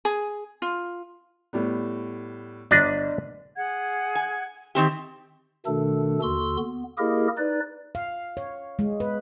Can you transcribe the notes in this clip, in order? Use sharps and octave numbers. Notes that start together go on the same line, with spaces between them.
G#4
F4
A2 G3 B3
G1 D4 D5 D#5 B6
G#4 F#5 G#6
G#5
D#3 C4 G4
B2 D#3 A3 D4 A4
D#2 D3 F#4 C6 E6
B3
A#3 E4 G4 G#4 A#4 D#5
D#4 B4 D5
F5
C#5
G#3
B4